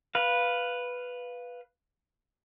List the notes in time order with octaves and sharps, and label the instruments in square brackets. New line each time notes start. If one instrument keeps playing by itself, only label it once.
[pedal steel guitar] B4 F5